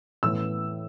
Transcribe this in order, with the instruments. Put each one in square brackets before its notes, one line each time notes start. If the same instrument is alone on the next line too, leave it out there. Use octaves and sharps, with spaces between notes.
[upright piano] A2 E3 B3 E6